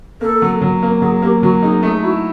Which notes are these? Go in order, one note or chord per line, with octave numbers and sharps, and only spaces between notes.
A#3 A4
F#3
F#3
A#3
F#3 G#4
A#3 G4
F#3 F#4
D#4 G#4
A3 G#4
E4 F#4